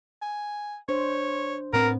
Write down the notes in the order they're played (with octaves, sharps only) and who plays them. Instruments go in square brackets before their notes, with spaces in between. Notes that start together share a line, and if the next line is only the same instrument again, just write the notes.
[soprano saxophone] G#5
[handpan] D4 C5 [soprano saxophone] C#5
[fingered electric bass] A2 C4 [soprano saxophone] B3 [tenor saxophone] A#4